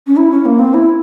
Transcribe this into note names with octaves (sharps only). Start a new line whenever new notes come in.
C#4
E4
C#4
A#3
C4
E4